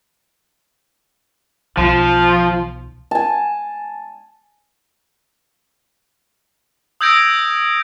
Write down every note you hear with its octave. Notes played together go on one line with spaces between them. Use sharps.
B1 D#3 F3 F4
G#5 A5
D#6 E6 G6 G#6 A#6 D7